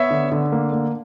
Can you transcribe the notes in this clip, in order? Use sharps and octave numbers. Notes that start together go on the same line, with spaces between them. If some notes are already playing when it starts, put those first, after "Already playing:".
Already playing: B3 C#5 E5
D3
D3
A#3
A#3